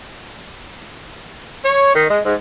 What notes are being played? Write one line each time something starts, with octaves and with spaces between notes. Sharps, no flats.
C#5
D#3
G#3
G#2